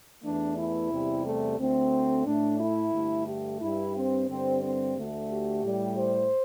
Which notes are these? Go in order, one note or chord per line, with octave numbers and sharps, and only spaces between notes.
E2 E3 A3 D4
E4
E2 C3 G3
A3
D2 D3 A3 C4
A2 A3 D4
E4
G2 D3 A3
G4
G2 G3 E4
C4
G2 D3 G3 C4
C4
D2 D3 A3
G4
A2 G3
C5